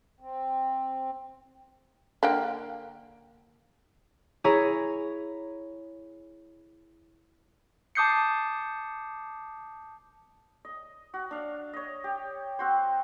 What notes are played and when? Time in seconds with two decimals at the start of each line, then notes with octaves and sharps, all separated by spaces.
0.20 C4
2.23 D3 A#3 G5
4.44 E4 G#4 C#5 A#5
7.95 A5 D6 D#6 G6 C7 C#7
10.65 D#5
11.14 F#4
11.31 D4 F5
11.73 C#5 D#5
12.04 G4
12.59 C4 F#4 C5